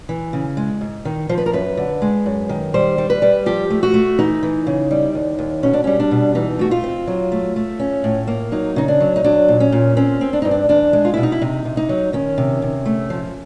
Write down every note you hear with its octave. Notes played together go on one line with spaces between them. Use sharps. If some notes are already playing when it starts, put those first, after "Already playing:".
E3
C#3
G#3
G#2
D#3
F3 C5
B4
A#4
F#2 B4
D3
G#3
F#2
D#3
G3 C5
G3
B4
G3
F3 G4
A3
F#4
A3
E3 D#4
E3
C#3
G3
D#2
D#2
B2 C#4
D4
G3 C#4
D4
B2
E3 D#4
A3 F#4
F4
C4
F#3
A3
A3
C#4
A2
A#3
F#3 D#4
C#3 D#4
D4
F#3
D#4
F#3 D4
A#2
C#4
A#2
C4 C#4
C4
D4
G2 D#4
D4
E2 D4
G#3
F4
B2 E4
D#4
E4
C3 D#4
C3
D#4
F#3
D#3 C#4
C3
C3
A3
F3